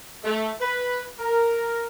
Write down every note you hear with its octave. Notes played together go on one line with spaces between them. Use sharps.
A3
B4
A#4